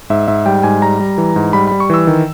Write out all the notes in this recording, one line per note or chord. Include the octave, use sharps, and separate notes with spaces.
G#2 E5
G#2 E5
G3 G5
G#2 G#5
G3 A#5
G3
E3
G#2
G3 B5
G3 B5
C#6
E3 E6
D#3